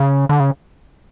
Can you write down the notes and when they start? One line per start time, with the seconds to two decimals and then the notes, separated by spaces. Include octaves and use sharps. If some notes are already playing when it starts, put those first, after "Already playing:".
Already playing: C#3
0.29 D3
0.40 C#3